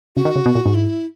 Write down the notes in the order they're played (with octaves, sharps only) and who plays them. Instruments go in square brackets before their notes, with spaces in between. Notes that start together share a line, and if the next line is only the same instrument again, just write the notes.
[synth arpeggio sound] C#3 [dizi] F#4
[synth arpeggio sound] D#3
C#3
B2
A#2
G#2
[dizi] E4